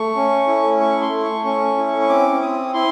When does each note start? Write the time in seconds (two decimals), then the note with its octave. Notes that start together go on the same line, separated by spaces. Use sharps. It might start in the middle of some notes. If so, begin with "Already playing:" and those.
Already playing: A3 C#6
0.16 C#4
0.47 E4
0.80 A3 C#6
1.02 C6
1.12 A3
1.23 C#6
1.44 C#4 C#6
1.77 E4
2.01 C#6
2.09 C4 D6
2.42 C4 D#6
2.74 E4 C6